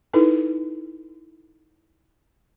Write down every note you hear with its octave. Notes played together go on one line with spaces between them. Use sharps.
D#4 E4 A4 B4